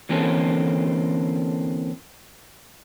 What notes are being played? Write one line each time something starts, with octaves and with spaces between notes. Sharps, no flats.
D3 E3 A#3 C4 C#4 A4